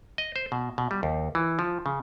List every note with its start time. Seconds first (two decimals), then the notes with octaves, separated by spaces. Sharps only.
0.18 D#5
0.36 C5
0.52 B2
0.78 B2
0.91 G3
1.03 D#2
1.35 E3
1.59 F3
1.86 C#3